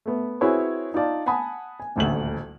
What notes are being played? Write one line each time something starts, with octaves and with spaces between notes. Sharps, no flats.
A3 B3
C4 E4 F#4 G#4 B4 C#5
D#4 F4 D5 A5
F#5 G#5 A5 B5 D#6
G#5
D#1 A1 D2 F#7